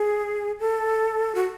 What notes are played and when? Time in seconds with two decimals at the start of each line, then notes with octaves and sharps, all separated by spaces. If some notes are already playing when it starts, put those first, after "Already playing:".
Already playing: G#4
0.60 A4
1.35 F#4